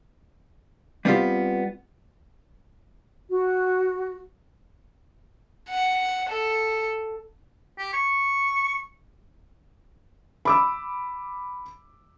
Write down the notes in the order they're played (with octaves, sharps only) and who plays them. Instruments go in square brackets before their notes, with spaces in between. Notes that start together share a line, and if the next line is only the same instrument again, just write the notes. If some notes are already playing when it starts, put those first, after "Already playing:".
[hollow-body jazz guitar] G3 B3 C4 D4 F4 G4
[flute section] F#4
[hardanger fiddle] F#5
A4
[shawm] G4
C#6
[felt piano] B5 D6 E6